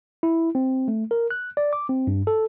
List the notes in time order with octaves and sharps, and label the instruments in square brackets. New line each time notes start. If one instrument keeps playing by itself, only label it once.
[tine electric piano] E4
C4
A3
A#4
F#6
D5
D6
C4
G2
A4